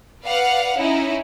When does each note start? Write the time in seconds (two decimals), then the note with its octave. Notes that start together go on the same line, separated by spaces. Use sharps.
0.24 B4 D5 F5 F#5
0.76 C#4 D#4 E4